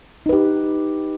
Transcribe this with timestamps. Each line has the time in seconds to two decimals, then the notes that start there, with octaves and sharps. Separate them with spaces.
0.26 D#4
0.29 B4
0.33 G4